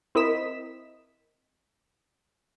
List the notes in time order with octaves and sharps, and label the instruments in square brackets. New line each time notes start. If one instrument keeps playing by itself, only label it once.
[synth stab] C4 E4 A#4 D#5 B6 E7